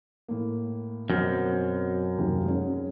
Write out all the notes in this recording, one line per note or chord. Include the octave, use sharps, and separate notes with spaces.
A2 A#3
F#2 B2 C4 F6
F#1 D#2 C3
G#3 C#4